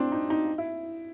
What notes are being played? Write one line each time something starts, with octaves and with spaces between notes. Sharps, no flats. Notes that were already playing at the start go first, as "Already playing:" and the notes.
Already playing: C4 D4
D#4
D#4
E4